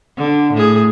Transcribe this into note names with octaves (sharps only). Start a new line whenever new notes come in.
D3
A2 G#4